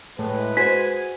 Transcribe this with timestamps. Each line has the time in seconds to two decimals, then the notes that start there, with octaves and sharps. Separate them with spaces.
0.19 A2 G#3 B4
0.57 F#4 C5 G#5 B6